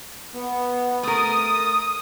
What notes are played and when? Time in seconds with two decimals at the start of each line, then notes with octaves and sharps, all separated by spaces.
0.34 B3
1.03 A3 A#4 D#6